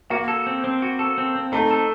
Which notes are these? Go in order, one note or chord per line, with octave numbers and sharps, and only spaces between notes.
A#3 F#4
A4
C4
C4
F#4
A4
C4
C4
A3 D#4
A4